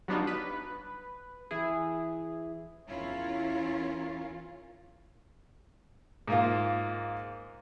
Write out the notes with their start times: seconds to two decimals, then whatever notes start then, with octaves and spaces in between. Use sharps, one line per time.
0.08 F#3 G3 B3 D4 D#4 F4
0.27 B4
1.51 E3 E4 G#4
2.88 E2 C#4 E4 F4 A#4 C#5
6.28 G#2 A#3 F4